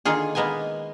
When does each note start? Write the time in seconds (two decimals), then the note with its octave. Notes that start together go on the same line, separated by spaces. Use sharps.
0.05 D3 D#3 A#3 F4 G#4
0.35 G#3 A#3 B3 D#5 G#5